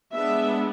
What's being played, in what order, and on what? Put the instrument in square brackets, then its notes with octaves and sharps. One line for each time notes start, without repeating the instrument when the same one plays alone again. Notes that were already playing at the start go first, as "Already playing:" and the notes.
[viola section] G#3 B3 D4 E5